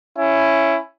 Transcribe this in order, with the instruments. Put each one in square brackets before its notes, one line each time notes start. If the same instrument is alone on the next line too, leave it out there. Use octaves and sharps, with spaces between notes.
[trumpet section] C#4 E4